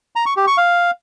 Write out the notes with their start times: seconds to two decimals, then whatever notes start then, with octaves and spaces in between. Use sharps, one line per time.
0.16 A#5
0.26 C#6
0.37 G4
0.47 C#6
0.57 F5